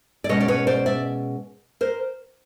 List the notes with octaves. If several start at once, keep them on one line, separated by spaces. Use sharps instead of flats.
D5
B2 G#3 C#4 C#5 D#5
D5
B4 C#5
C5 D5
D5 E5
A#4 C5